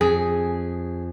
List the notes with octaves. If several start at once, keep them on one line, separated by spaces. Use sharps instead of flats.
F2 G#4